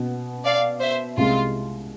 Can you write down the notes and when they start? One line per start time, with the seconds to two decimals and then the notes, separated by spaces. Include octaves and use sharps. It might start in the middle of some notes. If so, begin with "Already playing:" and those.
Already playing: B2 B3
0.44 D5 F5
0.81 C5 E5
1.17 C2 C3 G#3 F4